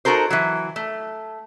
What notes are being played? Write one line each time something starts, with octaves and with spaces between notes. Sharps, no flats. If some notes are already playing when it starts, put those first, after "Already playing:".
D#4 F#4 A4 A#4 C5
E3 F#3
A3